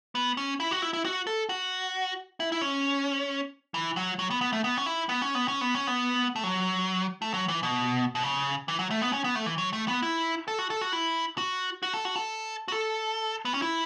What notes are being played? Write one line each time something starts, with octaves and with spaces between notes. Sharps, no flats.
B3
C#4
E4
F#4
E4
E4
F#4
A4
F#4
E4
E4
C#4
E3
F#3
F#3
B3
B3
A3
B3
C#4
E4
B3
C#4
B3
C#4
B3
C#4
B3
A3
F#3
A3
F#3
E3
B2
B2
C#3
E3
F#3
A3
B3
C#4
B3
A3
E3
F#3
A3
B3
E4
A4
F#4
A4
F#4
E4
F#4
F#4
A4
F#4
A4
F#4
A4
B3
C#4
E4